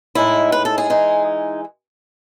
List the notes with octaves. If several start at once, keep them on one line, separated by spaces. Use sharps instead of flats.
A2 G#3 D#4 E4
B4
A4
G#4
E3 G#3 D#4